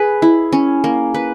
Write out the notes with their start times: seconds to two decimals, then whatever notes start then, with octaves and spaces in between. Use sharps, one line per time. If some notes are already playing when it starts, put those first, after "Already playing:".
Already playing: G#4 B4
0.22 E4
0.53 C#4
0.84 A#3
1.14 B4